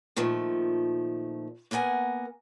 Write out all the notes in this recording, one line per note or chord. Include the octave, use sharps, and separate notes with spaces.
A#2 D#3 F3 A3
A#3 B3 A#4 F#5 G#5